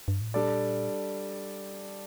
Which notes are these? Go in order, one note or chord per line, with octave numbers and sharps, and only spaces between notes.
G2
A2
A#2 G3 D4 A4 D5